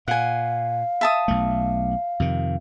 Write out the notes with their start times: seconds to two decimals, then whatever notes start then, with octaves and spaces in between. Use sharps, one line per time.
0.08 A#2 F5 F#5 G#5
1.01 E5 A5 D#6
1.28 B1 A3
2.20 F2 C3 D#3